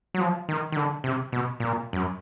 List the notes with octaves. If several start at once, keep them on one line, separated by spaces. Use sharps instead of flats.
F#3
F3
D#3
D#3
D3
C3
B2
A#2
F#2